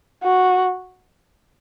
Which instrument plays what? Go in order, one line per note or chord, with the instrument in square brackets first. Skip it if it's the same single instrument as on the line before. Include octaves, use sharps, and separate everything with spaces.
[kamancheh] F#4